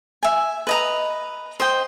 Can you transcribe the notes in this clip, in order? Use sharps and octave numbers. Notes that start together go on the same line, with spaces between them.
E5 G#5
B4 D#5 A#5
C5 D#5 G5